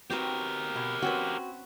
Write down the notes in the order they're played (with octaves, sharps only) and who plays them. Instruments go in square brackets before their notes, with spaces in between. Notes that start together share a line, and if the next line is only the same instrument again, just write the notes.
[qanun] C4 F#4 B4 [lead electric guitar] G4 A#4
[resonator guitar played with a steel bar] B2
[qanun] C4 C#4 B4 [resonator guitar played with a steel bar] F#4